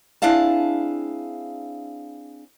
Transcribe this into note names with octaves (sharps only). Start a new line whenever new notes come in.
C4 D4 E4 G#4 F5 A5